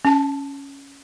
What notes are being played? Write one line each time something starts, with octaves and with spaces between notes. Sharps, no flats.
C#4 A5